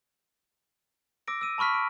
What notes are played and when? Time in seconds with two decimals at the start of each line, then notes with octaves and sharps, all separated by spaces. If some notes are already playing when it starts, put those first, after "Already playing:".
1.28 D6 E6 A#6 D7
1.41 E6 D#7
1.58 A5 B5 C#6 F6 B6
1.74 D7